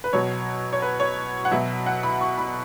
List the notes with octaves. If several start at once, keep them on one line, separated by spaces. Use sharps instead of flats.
B4
B2 F#3 C#5
C#5
B4
C#5
F#5
B2 F#3 E5
F#5
B5
C#6
B5